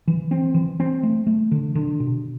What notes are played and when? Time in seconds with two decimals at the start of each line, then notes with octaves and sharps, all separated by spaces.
0.08 E3
0.31 C4
0.54 E3
0.80 C4
1.03 A3
1.27 A3
1.51 D3
1.75 D3
2.00 B2